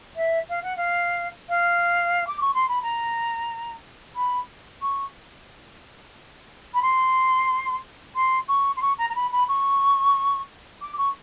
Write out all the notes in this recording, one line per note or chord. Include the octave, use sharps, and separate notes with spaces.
E5
F5
F#5
F5
F5
D6
C#6
C6
B5
A#5
B5
C#6
B5
C6
C6
C#6
C6
C#6
A#5
A#5
B5
B5
C#6
D6
C#6